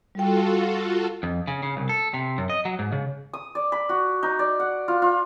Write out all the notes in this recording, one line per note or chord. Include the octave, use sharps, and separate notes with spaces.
G3 F4 F#4 A4 G5
F2
C#3
C#3
C2
A4
C3
F#2
D#5
F#3
G#2
C#3
D#6
D5
B5
F#4
D#4
D5
F#5
F4
F4